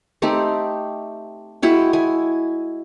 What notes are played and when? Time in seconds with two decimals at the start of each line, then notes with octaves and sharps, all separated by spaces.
0.22 A3 C4 D#4 G4
1.63 G#3 E4 F#4 G5
1.93 E4 G#5